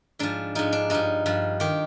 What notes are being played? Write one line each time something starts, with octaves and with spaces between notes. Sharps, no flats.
G#2 F3 D4
G#2 F3 D#4
D4
G2 F3 D#4
G2 F3
D#3 G4